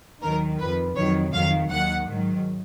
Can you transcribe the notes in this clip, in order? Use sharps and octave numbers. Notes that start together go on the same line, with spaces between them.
D#2 D#3 F#3 A#4
F2 F3 B4
F2 D#3 F#3 C#5
F2 D#3 F#3 F5
D#2 D#3 F#3 F#5
G#2 D#3 F#3